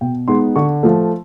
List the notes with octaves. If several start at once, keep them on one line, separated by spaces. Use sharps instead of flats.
B2 G5
G#3 B3 D#4 C6
D3 C#6
F3 A3